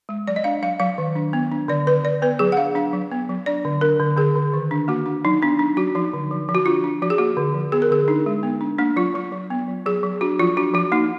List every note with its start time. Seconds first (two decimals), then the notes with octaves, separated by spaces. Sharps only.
0.09 G#3
0.27 F#3 D5
0.36 D#5
0.44 D4 F5
0.62 F#3 F5
0.80 F#3 F5
0.98 D#3
1.15 D4
1.33 B3
1.52 D4
1.68 D3 D5
1.86 D3 B4
2.04 D3 D5
2.22 B3 B4
2.39 F#3 G#4
2.52 F#5
2.57 D4 F5
2.75 D4 F5
2.93 F#3
3.12 B3
3.29 F#3
3.46 D4 D5
3.65 D3
3.81 D4 A#4
4.00 D3
4.17 D3 G#4
4.36 D3
4.54 D#3
4.71 D4
4.88 A#3 F#4
5.06 D4
5.25 F#3 D#4
5.42 B3 D4
5.59 D4
5.77 F#3 F#4
5.95 F3 D#4
6.13 D3
6.31 F3
6.49 F3
6.55 F#4
6.66 D4 F4
6.84 D4
7.02 F3 F#4
7.10 G#4
7.18 A#3 F#4
7.37 D3
7.54 F3
7.72 B3 G#4
7.82 A#4
7.90 D3 G#4
8.08 D4 D#4
8.26 G#3
8.43 B3
8.61 D4
8.79 A#3 D4
8.96 F#3 F4
9.14 F#3 F4
9.32 F#3
9.50 B3
9.68 F#3
9.86 F#3 G#4
10.03 F#3
10.21 D4 F#4
10.39 F3 F4
10.57 D4 F#4
10.74 F3 F#4
10.92 A#3 D#4